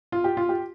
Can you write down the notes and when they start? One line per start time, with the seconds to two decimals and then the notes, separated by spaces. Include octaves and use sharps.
0.12 F4
0.24 G4
0.37 F4
0.49 G4